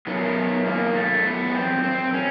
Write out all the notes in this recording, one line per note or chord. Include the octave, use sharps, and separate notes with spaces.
F#2 D#3 B3
A#3
A3
B3
C#4
C4
C4
C#4